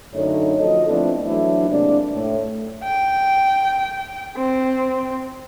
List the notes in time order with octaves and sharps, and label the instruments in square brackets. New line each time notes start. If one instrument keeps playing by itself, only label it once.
[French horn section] F#2 D3 A3 D#4 C#5
F3 F#4 A4 D#5
F3 A3 B3 C4 D4 E4
E3 F#3 A3 D4 E4
C3 G#3 A#3 D4
A2
[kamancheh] G5
C4